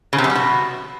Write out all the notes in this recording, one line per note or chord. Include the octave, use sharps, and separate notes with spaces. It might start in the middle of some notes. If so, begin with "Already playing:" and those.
C#3
C3
F#2
G3
B2